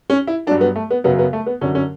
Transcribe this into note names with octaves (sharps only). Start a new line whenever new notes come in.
C#4
E4
G2 F#3 D4
B3
A3
B3
F#2 C#3 F#3 B3
B3
A3
B3
F#2 D3 F#3 C#4
C#4